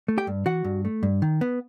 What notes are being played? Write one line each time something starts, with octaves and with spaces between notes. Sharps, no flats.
A3
G4 G5
G2
E3 F#4 F#5
G2
A3
G2
D#3
B3